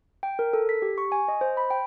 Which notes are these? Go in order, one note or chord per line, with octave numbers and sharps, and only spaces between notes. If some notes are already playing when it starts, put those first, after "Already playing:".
G5
A#4
A4
B6
G4
C#6
G#5
D#5
C5
B5
G5